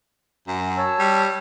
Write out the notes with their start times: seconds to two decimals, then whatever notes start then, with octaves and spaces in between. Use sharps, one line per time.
0.48 F#2
0.78 C#5 A5 E6
0.99 G3